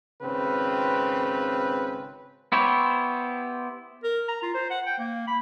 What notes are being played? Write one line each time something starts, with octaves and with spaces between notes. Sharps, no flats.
G#1 C#3 C4 B4
B3 E4 G4 C5 C#5
A#4
A#5
F4
C5
F#5
G5
A#3
B5